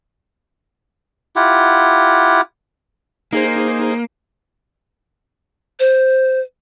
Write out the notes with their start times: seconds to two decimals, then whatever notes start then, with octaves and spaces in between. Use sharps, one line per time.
1.36 E4 F4 G4 F#5
3.33 A#3 D#4 G#4 C5
5.80 C5